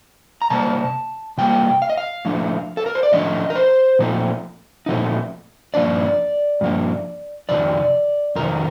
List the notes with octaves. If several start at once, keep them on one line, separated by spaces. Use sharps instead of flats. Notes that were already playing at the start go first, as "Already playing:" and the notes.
A#5
C3 G3 A#3 A5
C3 G3 A#3 G5
F5
D#5
F5
A2 F3 A3 D4
A4
A#4
C5
D5
A2 F3 A3 D4 D#5
A#4
C5
A#2 F3 A3 C4 D#4
A#2 F3 A3 C4 D#4
G2 F3 A#3 D4 D5
G2 F3 A#3 D4
F2 C3 D#3 D5
F2 C3 D#3 A#4